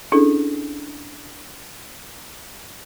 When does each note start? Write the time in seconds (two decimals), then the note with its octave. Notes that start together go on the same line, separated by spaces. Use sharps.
0.12 C#4 D4 E4 G#4 A4